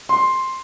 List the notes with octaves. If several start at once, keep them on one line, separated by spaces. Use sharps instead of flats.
C6